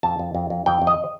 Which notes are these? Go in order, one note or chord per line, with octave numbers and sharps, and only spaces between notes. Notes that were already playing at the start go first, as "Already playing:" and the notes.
F2 A5
F2
F2
F2
F2 G5
F2
D#5